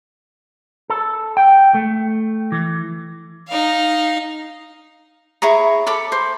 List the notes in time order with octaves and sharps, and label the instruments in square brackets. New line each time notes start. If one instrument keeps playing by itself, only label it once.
[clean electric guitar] A4
G5
A3
E3
[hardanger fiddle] D#4 F5
[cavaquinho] E4 G#4 C#5 A#5
A4 C#5 B5 D6
C5